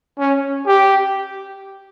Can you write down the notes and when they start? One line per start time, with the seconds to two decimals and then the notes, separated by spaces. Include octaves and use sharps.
0.19 C#4
0.67 G4